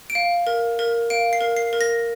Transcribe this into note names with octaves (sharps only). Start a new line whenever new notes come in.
D7
F5
A#4
A#4
F5 D7
C7
A#4
C7
A#4
A#6